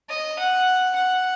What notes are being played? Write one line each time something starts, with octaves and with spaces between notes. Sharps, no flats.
D#5
F#5
F#5